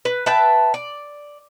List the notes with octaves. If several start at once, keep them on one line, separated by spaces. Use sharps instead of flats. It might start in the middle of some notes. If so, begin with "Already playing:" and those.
B4
B4 E5 G5 A5
D5